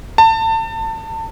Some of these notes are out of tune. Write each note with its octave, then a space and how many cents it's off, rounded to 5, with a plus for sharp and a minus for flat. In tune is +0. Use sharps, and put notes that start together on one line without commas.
A5 +30